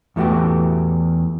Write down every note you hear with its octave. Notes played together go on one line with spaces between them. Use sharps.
E2 E3 A3 F#4 G4